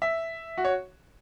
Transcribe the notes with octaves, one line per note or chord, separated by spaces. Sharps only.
E5
F#4
C#5